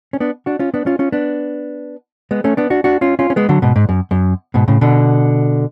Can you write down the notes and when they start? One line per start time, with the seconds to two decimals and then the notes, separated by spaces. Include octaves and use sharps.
0.13 C#4
0.20 B3 D4
0.46 D4 F#4
0.59 C#4 F4
0.74 B3 D4
0.86 C#4 F4
0.99 C#4 F4
1.12 B3 D4
2.31 G#3 B3
2.44 A3 C#4
2.57 B3 D4
2.70 D4 F#4
2.84 D4 F#4
3.01 C#4 F4
3.19 C#4 F4
3.30 C#4
3.36 G#3 B3
3.49 D3 F#3
3.62 G#2 B2
3.76 G#2
3.89 F#2
4.11 F#2
4.54 G#2 B2
4.68 A2 C#3
4.81 B2 D3